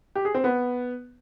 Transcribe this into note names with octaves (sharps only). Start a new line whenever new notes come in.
G4
G#4
C4
B3